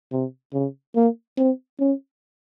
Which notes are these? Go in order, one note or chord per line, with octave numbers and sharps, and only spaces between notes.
C3
C#3
A#3
C4
C#4